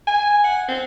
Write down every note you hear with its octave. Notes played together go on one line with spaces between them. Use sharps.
G#5
F#5
C4